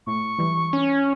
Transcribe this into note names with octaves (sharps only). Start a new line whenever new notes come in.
A2 C#6
E3 G3
C#4